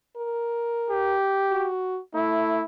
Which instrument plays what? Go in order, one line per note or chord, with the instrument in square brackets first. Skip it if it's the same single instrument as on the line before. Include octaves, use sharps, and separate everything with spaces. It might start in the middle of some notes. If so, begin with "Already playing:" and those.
[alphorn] A#4
[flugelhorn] G4
[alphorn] F#4
[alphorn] A3 [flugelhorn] E4